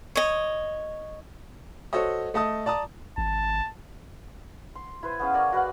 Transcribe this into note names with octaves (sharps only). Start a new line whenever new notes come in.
C#5 D#5
F#4 A4 C5 C#5 D#5
A3 D#5 A5 D#6
D5 A5 A#5 D#6
G#1 A5
C6
E4 B4 C5
B3 C#4 G#4 F5
A#4 C#5 D5 G#5
F#4 B4 F5 F#5